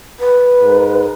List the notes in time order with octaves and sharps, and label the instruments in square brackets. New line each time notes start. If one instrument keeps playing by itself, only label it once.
[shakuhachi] B4
[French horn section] G#2 A#4